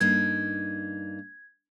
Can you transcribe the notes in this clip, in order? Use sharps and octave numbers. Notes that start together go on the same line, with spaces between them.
G2 A#3 D#4 G#6